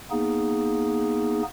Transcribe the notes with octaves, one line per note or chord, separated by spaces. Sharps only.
A#3 B3 D#4 G#4